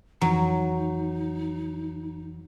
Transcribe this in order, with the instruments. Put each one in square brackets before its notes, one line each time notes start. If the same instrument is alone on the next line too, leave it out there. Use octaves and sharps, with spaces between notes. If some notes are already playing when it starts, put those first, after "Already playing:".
[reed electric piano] F2 E3 A#5 [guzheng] F#3 [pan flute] D#4